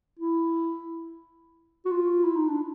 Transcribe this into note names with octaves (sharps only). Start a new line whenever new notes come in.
E4
F#4
F4
E4
D#4
D4